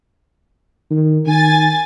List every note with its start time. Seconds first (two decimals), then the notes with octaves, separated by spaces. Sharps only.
0.91 D#3
1.27 D#3 G#5 A6